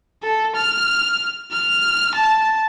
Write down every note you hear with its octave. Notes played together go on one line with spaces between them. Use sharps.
A4
F6
F6
A5